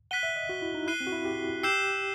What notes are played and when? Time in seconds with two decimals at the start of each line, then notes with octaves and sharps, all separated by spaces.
0.11 F#5 F#6 B6 D#7 G7
0.23 E5
0.36 D#5
0.49 F#4
0.62 E4
0.74 D#4
0.87 E4 F#6 C7 D#7 G7
1.00 C4
1.07 F#4
1.12 E4
1.25 G4
1.63 G4 E6 G6 C7 E7 G7